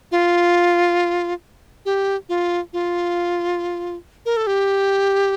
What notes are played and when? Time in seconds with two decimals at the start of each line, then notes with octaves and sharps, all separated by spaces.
0.11 F4
1.85 G4
2.29 F4
2.73 F4
4.26 A#4
4.37 A4
4.47 G4